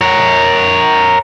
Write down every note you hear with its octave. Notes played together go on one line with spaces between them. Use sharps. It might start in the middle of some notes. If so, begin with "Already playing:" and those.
A#4 C#5